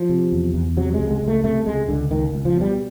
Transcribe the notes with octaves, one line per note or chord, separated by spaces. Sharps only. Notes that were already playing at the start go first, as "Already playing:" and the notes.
Already playing: F3
C3
E2
E2
C3 F#3
G#3
C#2
G#3
C#2
A3
C3 A3
C#2 G#3
C#2 D3
C#2 D#3
C#2
F3
B2 G3